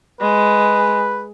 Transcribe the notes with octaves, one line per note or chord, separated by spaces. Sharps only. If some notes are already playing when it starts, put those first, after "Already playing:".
G#3 B4